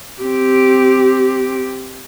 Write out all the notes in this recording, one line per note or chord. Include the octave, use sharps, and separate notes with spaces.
C4 G4